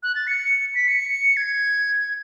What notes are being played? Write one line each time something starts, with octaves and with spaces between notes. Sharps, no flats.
F#6
A6
C#7
B6
C#7
G#6